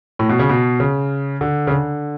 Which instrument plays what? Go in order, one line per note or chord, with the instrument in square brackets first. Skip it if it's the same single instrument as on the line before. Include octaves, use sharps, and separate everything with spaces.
[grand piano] A2
B2
C#3
B2
C#3
D3
C#3
D3